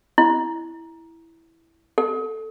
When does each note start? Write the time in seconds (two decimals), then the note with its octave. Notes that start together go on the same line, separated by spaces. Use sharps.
0.18 E4
1.98 A4